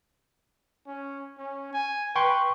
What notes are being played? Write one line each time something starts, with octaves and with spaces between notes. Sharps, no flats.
C#4
C#4
G#5
B4 G5 C6 C#6